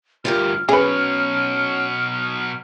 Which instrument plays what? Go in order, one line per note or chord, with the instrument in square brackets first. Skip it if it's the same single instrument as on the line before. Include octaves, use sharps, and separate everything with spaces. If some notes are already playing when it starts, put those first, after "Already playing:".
[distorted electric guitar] D2 G2 [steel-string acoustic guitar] F4 G4 A#4 [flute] F6
[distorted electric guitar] B2 F#3 [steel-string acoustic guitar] C#4 [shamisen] G#4 B4